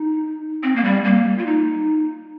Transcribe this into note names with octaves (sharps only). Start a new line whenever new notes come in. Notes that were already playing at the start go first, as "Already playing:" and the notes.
Already playing: D#4
C4
A#3
G3
A#3
F4
D#4